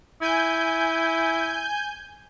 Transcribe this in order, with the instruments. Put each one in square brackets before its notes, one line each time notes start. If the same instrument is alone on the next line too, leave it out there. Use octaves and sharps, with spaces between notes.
[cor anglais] E4 [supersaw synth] G#5 G6